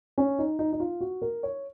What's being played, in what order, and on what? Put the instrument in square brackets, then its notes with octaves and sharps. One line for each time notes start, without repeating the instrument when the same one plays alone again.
[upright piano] C#4
D#4
D#4
D#4
F4
F#4
A#4
C#5